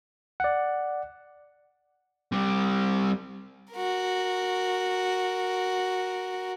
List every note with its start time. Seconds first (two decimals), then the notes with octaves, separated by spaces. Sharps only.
0.40 D5 F#5
2.32 G3 C4
3.73 F#4 A#4